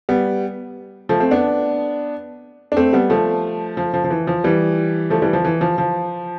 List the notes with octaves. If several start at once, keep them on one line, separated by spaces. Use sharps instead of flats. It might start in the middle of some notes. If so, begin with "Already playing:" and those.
G3 B3
F3 A3
A3 C4
B3 D4
D4
A3 C4
G3 B3
F3 A3
F3
F3
F3
E3
F3
E3 G3
F3 A3
E3 G3
F3
E3
F3
F3